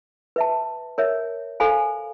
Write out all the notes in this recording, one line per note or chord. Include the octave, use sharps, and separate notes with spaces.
B4 E5 A5
A#4 C#5 E5
A4 C5 F5 G#5 B5